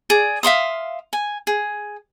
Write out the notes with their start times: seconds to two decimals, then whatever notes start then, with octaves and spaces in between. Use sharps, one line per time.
0.10 G#4 D5
0.43 E5 F5 C6 D#6
1.13 G#5
1.47 G#4